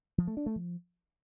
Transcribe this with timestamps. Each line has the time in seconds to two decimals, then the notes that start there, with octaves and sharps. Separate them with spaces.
0.18 F3
0.27 A3
0.37 D4
0.46 A3
0.56 F3